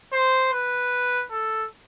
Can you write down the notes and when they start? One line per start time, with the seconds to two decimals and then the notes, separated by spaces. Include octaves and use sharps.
0.13 C5
0.53 B4
1.31 A4